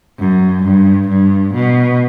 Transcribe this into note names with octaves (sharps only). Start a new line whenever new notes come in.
F#2
G2
G2
B2